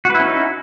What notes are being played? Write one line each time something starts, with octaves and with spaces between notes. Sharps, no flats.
C#4 D#4 E4 F#4 B4